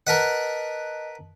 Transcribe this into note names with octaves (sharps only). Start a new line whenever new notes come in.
A#4 B4 D#5 F#5 A5